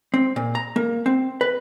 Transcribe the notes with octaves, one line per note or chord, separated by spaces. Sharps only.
C4
A#2
A#5
A#3
C4
B4